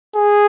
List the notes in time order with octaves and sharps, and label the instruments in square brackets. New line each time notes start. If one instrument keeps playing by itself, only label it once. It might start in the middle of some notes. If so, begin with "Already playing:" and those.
[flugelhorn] G#4